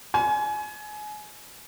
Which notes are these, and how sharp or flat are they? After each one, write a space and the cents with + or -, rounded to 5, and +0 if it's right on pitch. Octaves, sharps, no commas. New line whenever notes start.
G#5 +25